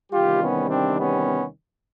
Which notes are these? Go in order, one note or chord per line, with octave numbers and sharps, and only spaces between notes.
E2 C3 D#3 G3 F4 G4
B3 C#4
C4 D4
B3 C#4